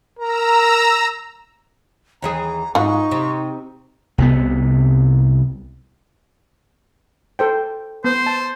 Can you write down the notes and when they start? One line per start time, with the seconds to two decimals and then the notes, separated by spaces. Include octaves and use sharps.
0.19 A#4 A#5 E6
2.22 D#2 E3 G#4 A#5
2.75 G#2 D#4 F4 F#4 C#6
3.11 C3
4.18 C2 C3 B3
7.39 A4 C5 G5
8.04 B3 C5
8.26 A5